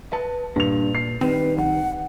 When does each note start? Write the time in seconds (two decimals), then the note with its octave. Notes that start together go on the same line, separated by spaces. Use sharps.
0.13 B4 A5
0.56 E2 G2 A#2 F7
0.95 C7
1.21 D#3 G3 C4 B4
1.58 B1 F#5